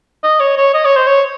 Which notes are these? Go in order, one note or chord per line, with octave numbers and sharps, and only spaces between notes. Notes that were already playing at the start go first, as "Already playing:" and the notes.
D#5
C#5
C#5
D#5
C#5
C5
C#5